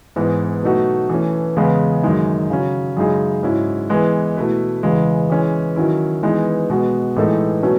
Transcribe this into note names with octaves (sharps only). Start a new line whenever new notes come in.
G#2 E3 B3 D#4
B2 F#3 A3 D#4 F#4
E3 A3 C#4
E2 C#3 G#3 B3
F#2 D#3 G#3 D#4
C#3 F#3 C#4
F#2 C#3 G#3 D#4 G#4
G#2 F#3 C#4 E4
E3 G#3 B3
B2 A3 E4 B4
E2 C#3 E3 G#3
E3 G#3 C#4
D#3 F#3 C#4 E4
E3 G#3 B3 D#4
B2 G#3 B3 F#4
A2 E3 G#3 D#4 A4
B2 F#3 A3 C#4